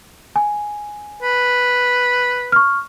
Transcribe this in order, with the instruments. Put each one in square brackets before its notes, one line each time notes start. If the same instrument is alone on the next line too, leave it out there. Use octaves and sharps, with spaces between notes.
[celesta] G#5
[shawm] B4
[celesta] C#6 F6